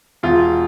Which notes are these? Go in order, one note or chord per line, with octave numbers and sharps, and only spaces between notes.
E1 F4